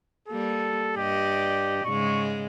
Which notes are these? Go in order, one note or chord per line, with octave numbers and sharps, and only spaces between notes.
G3 A#3 A4
G2 G4 D5 D#5
G#2 C#3 G#3 C#6